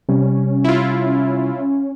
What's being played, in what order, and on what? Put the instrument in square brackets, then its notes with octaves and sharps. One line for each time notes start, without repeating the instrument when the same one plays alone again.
[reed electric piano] C3 G3 [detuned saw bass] C#4
[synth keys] E4 F4